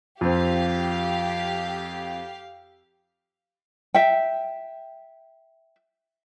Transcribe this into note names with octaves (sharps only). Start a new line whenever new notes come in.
F2 C4 G4 F5
E5 G5